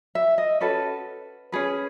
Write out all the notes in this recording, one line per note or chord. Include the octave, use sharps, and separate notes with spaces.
E5
D#5
C#4 F#4 A4 B4
C#4 G#4 B4